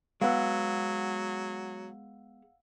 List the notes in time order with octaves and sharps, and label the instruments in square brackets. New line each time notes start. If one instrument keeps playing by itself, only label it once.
[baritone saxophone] F#3 [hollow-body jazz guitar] G#3 B3 [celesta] F5 F#5 E6